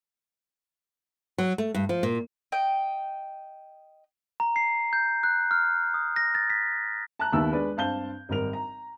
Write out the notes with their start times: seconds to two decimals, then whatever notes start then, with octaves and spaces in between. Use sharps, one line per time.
1.38 F#3
1.58 A3
1.75 G2
1.89 F3
2.03 A#2
2.52 D#5 G5
4.40 A#5
4.56 C7
4.93 G6
5.23 F#6
5.51 F6
5.94 D#6
6.16 A#6
6.35 A6
6.50 B6
7.19 A5 A#5 F#6
7.32 D#2 D#3 B3 E5 A5 E6
7.52 G#3 D4 B4 D5
7.77 G2 C4 F5 A5 G6 G7
8.29 G#1 G3 A#4 F7
8.53 A#5